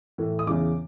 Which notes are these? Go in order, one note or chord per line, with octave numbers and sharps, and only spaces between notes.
A2 E3
D#6
E2 C#3 E3 D6